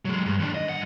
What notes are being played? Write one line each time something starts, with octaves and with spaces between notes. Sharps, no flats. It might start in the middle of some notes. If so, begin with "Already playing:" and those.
F#3 G#3
G2
D#2 D4
D#5
G2 F#5